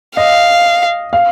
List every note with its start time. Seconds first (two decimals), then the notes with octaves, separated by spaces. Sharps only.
0.17 D#5 F5
1.13 F5